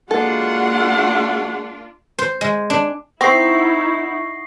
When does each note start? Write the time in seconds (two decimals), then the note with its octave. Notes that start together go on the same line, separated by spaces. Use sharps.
0.11 G#3 A#3 D4 F4 F#4 A4 F#5
2.19 C5
2.41 G#3
2.70 D4
3.21 C4 D#4 E4 F#5 C#6 D#6 A#6 C7